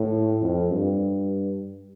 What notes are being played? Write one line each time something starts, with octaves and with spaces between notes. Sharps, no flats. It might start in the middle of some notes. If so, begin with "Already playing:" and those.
Already playing: A2
F2
G2